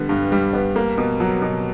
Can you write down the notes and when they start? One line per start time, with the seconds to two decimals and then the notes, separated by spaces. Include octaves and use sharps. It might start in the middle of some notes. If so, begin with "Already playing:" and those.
Already playing: D3 G3 B3
0.09 G2
0.32 G3
0.53 B3
0.76 A#3
0.98 B2
1.20 F#3
1.42 B2